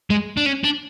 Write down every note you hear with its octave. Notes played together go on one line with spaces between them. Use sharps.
G#3
D4
C#4
D4